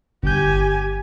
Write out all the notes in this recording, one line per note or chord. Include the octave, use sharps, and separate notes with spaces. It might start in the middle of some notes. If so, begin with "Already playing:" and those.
G1 G4 G#5 G6